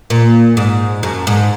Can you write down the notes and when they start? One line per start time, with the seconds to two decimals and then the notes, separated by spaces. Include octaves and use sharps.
0.10 A#2
0.57 G#2
1.03 F#2
1.27 G#2